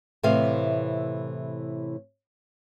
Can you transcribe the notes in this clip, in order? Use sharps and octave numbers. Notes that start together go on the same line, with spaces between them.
A2 C3 E3 C5 F5